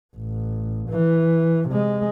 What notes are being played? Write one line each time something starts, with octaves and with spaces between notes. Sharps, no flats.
A1
E3
C3 G#3